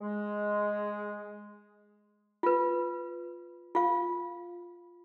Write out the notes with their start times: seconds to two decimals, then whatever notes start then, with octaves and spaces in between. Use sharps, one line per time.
0.01 G#3
2.43 F4 B4
3.75 F4 F5